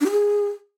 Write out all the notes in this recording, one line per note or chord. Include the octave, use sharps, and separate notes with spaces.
D4
G4
G#4